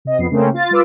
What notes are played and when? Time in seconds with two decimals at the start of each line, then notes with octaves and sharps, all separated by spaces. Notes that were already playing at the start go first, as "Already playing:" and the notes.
0.05 C3 D#5
0.18 F2 B3 C7
0.31 C#3 A3 A#3 C4 C#4
0.54 F4 A6
0.71 G3 F4 B4 D6 E6